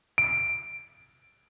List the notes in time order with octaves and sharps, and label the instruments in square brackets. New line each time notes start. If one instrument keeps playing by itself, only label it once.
[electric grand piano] D7